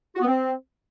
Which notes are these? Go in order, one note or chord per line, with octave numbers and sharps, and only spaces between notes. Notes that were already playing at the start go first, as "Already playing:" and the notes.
F#4
B3
C4